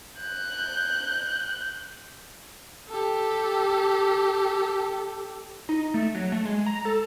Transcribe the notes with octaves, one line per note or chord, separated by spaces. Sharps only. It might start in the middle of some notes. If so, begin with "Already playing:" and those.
F#6 G6
G4 A4
D#4
A3
F#3
A3
G#3
A#5
A4